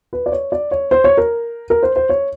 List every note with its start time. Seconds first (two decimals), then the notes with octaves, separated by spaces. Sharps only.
0.13 B4
0.26 D5
0.32 C#5
0.52 D5
0.71 C#5
0.91 C5
1.04 C#5
1.17 A#4
1.70 A#4
1.83 C5
1.96 C5
2.09 C#5